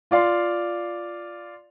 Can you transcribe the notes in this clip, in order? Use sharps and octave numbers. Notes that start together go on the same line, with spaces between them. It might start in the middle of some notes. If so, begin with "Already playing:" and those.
F4 D5 F5 C6